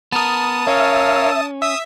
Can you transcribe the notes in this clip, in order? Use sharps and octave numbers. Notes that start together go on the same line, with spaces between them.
B3 A#4 A5 D#6
C#4 A#4 C#5 E5 F5
E5 D#6 E6